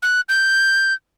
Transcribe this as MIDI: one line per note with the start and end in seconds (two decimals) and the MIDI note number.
0.02 0.21 90
0.29 0.93 91